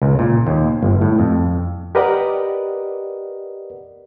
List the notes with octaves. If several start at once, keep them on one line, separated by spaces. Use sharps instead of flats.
C#2
A#2
D#2
G1
A2
F2
G4 A#4 B4 D5 D#5 F#5